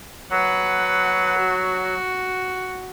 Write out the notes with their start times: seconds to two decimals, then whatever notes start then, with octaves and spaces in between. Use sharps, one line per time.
0.32 F#3 B4 F#5
1.38 F#4